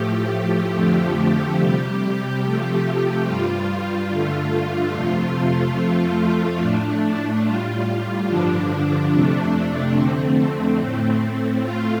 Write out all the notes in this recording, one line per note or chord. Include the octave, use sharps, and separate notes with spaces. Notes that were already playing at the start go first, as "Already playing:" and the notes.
Already playing: A2 F3 A3 G4
F2 D3 F3 A3
C3 G3
C3 F3 A3
G2 G3 F4
G2 D3 A3
F2 C3 F3 A3
F2 F3 A3
A2 A3 D4
A2 G3 F4
G2 D3 F3 D4
F2 C3 A3
F2 D3 A3 C4
A2 A3
A2 A3 F4